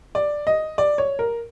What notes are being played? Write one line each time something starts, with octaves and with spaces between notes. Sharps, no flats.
D5
D#5
D5
C#5
A#4